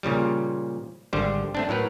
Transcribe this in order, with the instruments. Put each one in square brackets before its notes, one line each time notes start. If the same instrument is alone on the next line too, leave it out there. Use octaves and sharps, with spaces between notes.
[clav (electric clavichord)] A#2 C#3 F3 G3
G#1 D3 G3 C5
A3 C4 D4
A2 F#3 A#4 B4